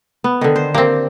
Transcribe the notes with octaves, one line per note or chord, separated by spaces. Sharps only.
B3
D3 D#3
C5
A#3 C4 G4